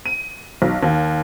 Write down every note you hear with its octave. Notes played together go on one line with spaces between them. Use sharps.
D#7
B1
D#2